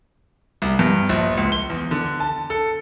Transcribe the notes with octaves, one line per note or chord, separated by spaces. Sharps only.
C2
G2
A#1
C#2
G7
E2
D3
A5
A4